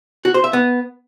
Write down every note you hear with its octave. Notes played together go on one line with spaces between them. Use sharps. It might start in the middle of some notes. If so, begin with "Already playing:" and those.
F#4
C5
E5
B3